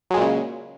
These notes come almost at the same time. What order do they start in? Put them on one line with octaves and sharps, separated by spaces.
F#3 G#3 A#2 C#3